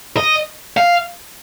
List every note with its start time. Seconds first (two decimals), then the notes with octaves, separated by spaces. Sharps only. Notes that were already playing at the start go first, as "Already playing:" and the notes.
0.17 D#5
0.77 F5